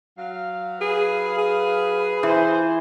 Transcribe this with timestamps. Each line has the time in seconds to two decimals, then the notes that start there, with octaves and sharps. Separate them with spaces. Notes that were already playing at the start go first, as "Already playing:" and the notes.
0.17 F#3 F#4 F5
0.81 G#4 B4
1.38 G#4
2.23 E3 E4 F4 C5